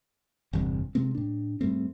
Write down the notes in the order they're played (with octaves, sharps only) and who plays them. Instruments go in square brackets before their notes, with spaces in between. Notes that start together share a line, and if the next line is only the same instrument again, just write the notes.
[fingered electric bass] G1 E2 G2 C3
C3 G#3 A#3 C4
A2 D4
G#2 G3 A3 C4